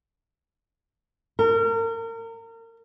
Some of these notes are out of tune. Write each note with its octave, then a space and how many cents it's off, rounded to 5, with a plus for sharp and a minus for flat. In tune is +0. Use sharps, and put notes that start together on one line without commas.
A#4 -35